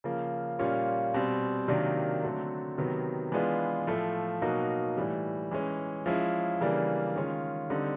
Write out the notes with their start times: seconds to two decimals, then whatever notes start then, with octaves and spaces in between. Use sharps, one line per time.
0.04 C#3 F3 A#3
0.59 A#2 G3 A#3 C#4 F4
1.14 B2 G3 C4
1.68 C3 D#3 F#3 A#3 D4
2.23 D3 F#3 A3 C4
2.78 C3 D#3 F#3 B3
3.32 E3 G#3 B3 D4 F4
3.87 A2 F3 A3
4.42 B2 F#3 A#3 D#4 F#4
4.97 A2 E3 G3
5.51 E3 G#3 C#4
6.06 F3 G#3 C#4 E4
6.61 C#3 E3 G3 A#3 D4
7.16 D#3 G#3 C#4 F4
7.70 D3 G3 C4 D#4